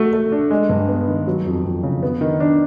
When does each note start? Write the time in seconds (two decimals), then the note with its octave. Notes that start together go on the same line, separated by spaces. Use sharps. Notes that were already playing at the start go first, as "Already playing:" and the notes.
Already playing: A3 F#4
0.13 A3
0.32 D4
0.50 G#3
0.69 G2
0.89 B3
1.08 D#3
1.27 F#3
1.46 F2
1.65 F2
1.83 C#3
2.03 B3
2.21 D#3
2.40 D4